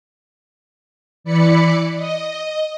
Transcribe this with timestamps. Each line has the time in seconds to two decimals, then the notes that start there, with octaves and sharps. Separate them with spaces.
1.24 E3 D5 B5 C#7
1.96 D#5